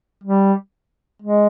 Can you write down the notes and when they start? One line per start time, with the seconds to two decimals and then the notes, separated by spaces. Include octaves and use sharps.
0.24 G3
1.22 G#3